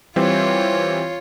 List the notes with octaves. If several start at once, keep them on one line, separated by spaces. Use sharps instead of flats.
E3 G3 C4 F4 C#5